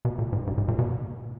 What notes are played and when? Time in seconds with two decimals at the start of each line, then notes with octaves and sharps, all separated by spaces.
0.05 B2
0.19 A#2
0.33 G#2
0.47 G2
0.58 G#2
0.68 A#2
0.79 B2